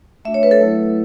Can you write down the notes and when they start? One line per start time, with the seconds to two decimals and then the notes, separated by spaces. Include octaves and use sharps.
0.25 A3 D4 F#4 E5
0.34 C#5
0.43 B4
0.51 A4
0.59 F#3 A3 E4